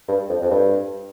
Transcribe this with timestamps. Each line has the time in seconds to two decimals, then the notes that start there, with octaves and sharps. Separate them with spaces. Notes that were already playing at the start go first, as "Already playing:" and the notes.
0.09 G2
0.29 F2
0.42 F2
0.51 G2